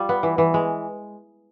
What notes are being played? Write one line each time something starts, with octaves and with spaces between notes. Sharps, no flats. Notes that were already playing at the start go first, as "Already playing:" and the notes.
Already playing: G3 F4
B3
E3
E3
G#3